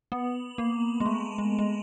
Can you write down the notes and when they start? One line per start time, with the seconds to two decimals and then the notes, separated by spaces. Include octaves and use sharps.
0.12 B3
0.58 A#3
1.00 G#3
1.06 A3
1.38 G#3
1.59 G#3